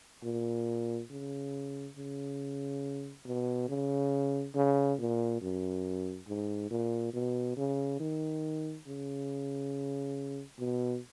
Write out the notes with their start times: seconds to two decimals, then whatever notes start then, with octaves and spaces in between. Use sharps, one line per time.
0.23 A#2
1.10 C#3
1.96 C#3
3.26 B2
3.69 C#3
4.55 C#3
4.99 A#2
5.41 F#2
6.28 G#2
6.71 A#2
7.14 B2
7.57 C#3
8.00 D#3
8.87 C#3
10.59 B2